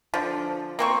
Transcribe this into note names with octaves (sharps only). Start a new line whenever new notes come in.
D3 F3
A#3 C4 C#6